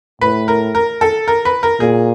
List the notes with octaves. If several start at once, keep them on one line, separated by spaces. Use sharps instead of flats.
A2 B4
A#4
A#4
A4
A#4
B4
A#4
A#2 G#4